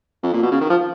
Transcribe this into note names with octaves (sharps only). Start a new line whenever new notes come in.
F2
A#2
B2
C#3
D#3
F3